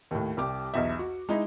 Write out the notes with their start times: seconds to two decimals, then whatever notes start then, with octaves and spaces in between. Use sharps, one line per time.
0.11 D#2 A2
0.37 C2 G4 D6
0.74 B1 E2 E5
0.99 F#4
1.29 G#3 D#4 E4